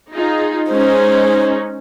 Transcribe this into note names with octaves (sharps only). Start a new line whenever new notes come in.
D#4 F4 G#4
G#3 C#4 D#4 C5